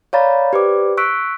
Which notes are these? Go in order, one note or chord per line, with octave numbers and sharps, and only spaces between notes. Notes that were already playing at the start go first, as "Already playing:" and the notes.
C#5 D5 F5 A#5 B5 A6
G4 B4 C5 D5 D6
C#6 E6 F#6 B6 D7